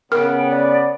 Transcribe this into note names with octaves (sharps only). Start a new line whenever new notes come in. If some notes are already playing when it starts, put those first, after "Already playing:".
C#3 B3 A#4 G5
D5